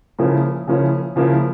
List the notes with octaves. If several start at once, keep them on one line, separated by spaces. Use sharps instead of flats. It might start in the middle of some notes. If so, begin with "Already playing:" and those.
C#3 F3 A#3 C#4 E4
C#3 F3 A#3 C#4 E4
C#3 F3 A#3 C#4 E4